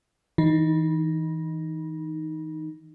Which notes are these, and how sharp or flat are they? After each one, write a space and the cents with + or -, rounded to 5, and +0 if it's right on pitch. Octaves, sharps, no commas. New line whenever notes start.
E3 -30 D#4 +0